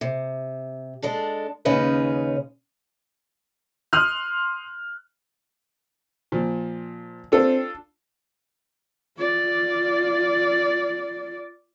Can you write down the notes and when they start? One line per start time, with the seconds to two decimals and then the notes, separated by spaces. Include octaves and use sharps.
0.01 C3
1.02 G#3 D4 A4
1.65 D#2 C#3 G#3 C#4 D#4 B4
3.93 C6 D#6 F6 F#6
6.32 A#2 F3
7.32 C4 D4 F4 A4
9.18 F4 D5